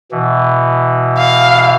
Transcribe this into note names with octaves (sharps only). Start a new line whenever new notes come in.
B2 E3
F5